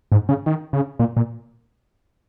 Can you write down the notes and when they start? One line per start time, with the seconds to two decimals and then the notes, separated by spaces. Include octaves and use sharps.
0.12 G#2
0.29 C#3
0.46 D#3
0.73 C#3
0.99 A#2
1.17 A#2